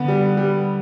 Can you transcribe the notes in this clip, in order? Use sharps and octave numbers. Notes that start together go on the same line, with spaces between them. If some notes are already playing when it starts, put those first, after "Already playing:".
Already playing: D3 B3
G3
G3